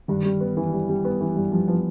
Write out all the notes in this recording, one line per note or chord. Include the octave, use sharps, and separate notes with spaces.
G2 D#3
G3
B3
E3
G2
G3
B3
E3
G2
F3 G3
F3 B3